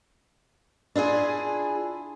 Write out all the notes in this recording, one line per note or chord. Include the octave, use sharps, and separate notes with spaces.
D4 E4 F4 G#4